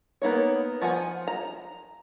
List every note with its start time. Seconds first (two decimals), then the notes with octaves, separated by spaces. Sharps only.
0.22 A#3 B3 D#4 C#5
0.82 F3 F4 F#5 G#5
1.28 A#5